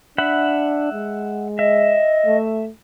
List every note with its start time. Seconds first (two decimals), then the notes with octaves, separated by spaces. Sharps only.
0.18 D4 E5 F#5 B5
0.93 G#3
1.59 D#5 E5
2.26 A3